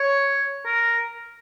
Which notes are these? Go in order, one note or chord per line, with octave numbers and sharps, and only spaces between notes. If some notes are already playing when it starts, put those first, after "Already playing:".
Already playing: C#5
A#4